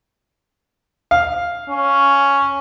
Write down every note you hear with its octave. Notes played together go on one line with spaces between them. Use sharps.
F5
C#4